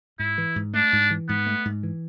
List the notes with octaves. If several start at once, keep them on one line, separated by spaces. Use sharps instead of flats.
G#2 E4
E3
G#2
A3 D4
G#2
E3
G#2 B3
A3
G#2
E3